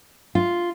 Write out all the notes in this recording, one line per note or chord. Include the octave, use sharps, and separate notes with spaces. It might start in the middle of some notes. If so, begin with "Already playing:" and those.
F4